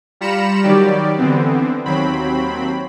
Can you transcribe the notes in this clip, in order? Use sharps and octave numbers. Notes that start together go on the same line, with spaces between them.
G3 F4 A#5 B5 C#7 E7
D#3 F#3 G3 G4 D5
D3 E3 B3 C4
D#2 F#3 C4 B5